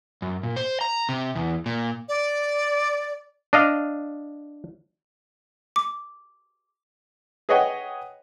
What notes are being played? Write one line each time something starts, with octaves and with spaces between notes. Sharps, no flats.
F#2
A#2
C5
A#5
C3
E2
A#2
D5
D4 D#5 F5
D6
G#4 B4 C#5 D#5 F#5 G5